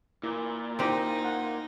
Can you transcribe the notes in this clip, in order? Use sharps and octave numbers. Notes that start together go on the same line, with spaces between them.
A#2 E4
C4 D#4 E4 G4 C5
F#5